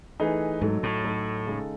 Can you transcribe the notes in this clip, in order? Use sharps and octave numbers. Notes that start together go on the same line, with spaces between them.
E3 A3 D#4 G#4 B4
G#2 F#3 A3 D#4 A4
A2
F#3 A3 D#4 A4
C#3 G#3 D#4 A4